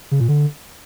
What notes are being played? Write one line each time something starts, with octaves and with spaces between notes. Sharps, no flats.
C#3
A#2
D3